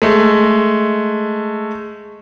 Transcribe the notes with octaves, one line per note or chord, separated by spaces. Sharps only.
G#3 A3